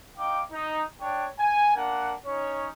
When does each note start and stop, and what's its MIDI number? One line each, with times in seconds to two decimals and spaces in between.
0.17 0.41 63
0.17 0.41 77
0.17 0.41 79
0.17 0.41 86
0.51 0.83 63
1.00 1.25 62
1.00 1.25 73
1.00 1.25 79
1.39 1.73 80
1.75 2.13 58
1.75 2.13 62
1.75 2.13 78
2.25 2.69 61
2.25 2.69 63
2.25 2.69 73